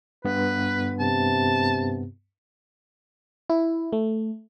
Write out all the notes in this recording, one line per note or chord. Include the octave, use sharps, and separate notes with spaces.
G2 B3 B4
C3 A5
E4
A3